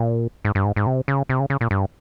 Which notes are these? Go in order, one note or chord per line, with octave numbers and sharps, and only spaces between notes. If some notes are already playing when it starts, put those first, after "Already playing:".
Already playing: A#2
G#2
G2
G#2
G#2
C3
C#3
C3
C#3
C#3
A#2
G2